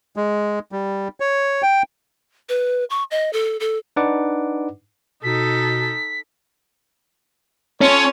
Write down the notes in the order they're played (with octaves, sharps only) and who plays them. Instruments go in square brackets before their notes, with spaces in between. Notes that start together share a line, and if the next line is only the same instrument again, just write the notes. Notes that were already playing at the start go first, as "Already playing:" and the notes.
[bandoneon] G#3
G3
C#5
G5
[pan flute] B4
C#6
D#5
A4
A4
[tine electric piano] D4 D#4 B4 D5 F#5 D6
[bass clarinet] B2 [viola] D#4 A4 [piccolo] B6
[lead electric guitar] C#4 [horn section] F4 A4 C#5